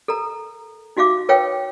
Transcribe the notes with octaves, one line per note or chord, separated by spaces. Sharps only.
A4 A#4 A#5
D#4 F#4 E5 F5 D6
A#4 B4 C#5 F5 G5